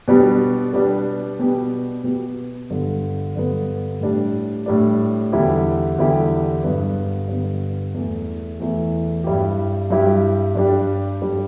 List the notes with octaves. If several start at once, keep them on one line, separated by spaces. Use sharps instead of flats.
B2 G3 B3 D4 G4
B2 G3 B3 D4 G4
B2 B3 G4
B2 B3 G4
G2 D3 B3
G2 D3 B3
A2 G3 D4
A2 G3 D4
E2 D3 G3 E4 G4
E2 D3 G3 E4 G4
G2 D3 B3
G2 D3 B3
E2 E3 A3
E2 E3 A3
G2 G3 E4 G4
G2 G3 E4 G4
G2 G3 D4 G4
G2 G3 D4 G4